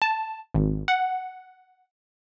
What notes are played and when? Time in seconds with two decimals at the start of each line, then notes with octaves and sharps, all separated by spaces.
0.02 A5
0.54 G#1
0.88 F#5